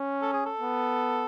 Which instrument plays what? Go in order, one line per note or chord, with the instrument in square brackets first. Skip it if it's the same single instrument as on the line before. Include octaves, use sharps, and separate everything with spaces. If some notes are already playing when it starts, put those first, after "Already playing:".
Already playing: [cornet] C#4
[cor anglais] A4
G#4
A4
[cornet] B3